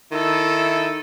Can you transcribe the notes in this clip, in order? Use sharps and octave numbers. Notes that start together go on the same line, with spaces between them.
D#3 E4 A4